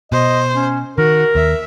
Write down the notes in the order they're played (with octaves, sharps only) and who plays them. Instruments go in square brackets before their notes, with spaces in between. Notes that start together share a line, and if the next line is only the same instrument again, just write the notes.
[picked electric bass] B2 [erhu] C5 [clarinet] D#5
[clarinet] C#4
[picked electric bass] D#3 [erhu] F#4 [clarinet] A#4
[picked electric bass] D#2 [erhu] E5